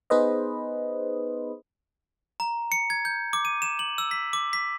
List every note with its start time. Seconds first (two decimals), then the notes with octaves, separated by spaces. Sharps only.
0.10 B3 D#4 G#4 B4 C5 D#5
2.40 A#5
2.72 C#7
2.90 G#6
3.05 G6
3.33 D6
3.45 D#7
3.62 E7
3.79 F#7
3.98 E6
4.11 B6
4.33 D6
4.53 B6